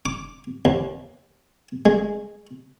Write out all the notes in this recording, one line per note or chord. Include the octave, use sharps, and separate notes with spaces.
D6
D#2
G#3